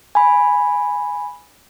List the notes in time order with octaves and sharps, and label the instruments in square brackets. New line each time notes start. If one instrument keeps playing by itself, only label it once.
[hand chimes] G#5 B5